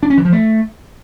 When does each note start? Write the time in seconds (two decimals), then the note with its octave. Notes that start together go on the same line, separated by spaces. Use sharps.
0.03 D4
0.10 C#4
0.18 E3
0.25 F3
0.32 A3